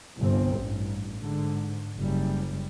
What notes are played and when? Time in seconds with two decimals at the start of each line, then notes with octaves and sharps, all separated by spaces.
0.18 G1 C2 C4
0.55 A1 G2
1.20 G#2 D3
1.96 F#1 G3